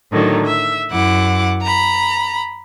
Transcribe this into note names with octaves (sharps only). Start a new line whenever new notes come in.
A2 D3 D#3 F#3
E5
F#2 E4 F#5 D6
A#5 B5